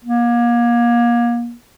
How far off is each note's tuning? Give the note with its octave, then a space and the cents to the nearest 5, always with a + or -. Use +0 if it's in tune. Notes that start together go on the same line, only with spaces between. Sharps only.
A#3 +30